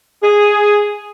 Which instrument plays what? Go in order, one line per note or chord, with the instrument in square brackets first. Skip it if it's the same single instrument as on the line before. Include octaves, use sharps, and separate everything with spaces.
[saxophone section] G#4